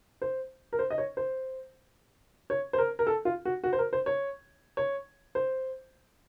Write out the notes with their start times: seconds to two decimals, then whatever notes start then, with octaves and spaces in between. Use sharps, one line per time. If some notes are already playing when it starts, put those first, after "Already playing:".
0.22 C5
0.73 A#4
0.79 C5
0.90 D#5
0.98 C#5
1.17 C5
2.50 C#5
2.73 C5
2.78 A#4
2.99 A#4
3.07 A4
3.25 F4
3.45 F#4
3.64 F#4
3.73 C5
3.79 A#4
3.93 C5
4.06 C#5
4.77 C#5
5.35 C5